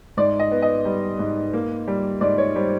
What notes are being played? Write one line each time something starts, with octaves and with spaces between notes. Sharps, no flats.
G#2 D5
D#5
B3
D#5
G3
G#2
A#3
G3
G#2 D5
C#5
G3 C5